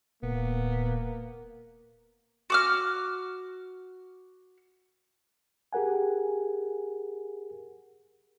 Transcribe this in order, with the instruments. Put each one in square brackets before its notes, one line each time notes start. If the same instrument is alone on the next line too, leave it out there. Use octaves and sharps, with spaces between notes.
[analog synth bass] D#1 [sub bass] A#2 [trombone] A#3 [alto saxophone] B3
[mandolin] F#4 D6 F6
[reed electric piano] G4 G#4 A#4 F#5 G#5